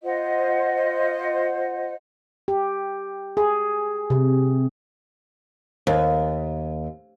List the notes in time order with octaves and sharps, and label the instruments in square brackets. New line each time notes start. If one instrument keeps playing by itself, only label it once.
[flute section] F4 C5 D#5 F#5
[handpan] G4
G#4
C3
[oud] D#2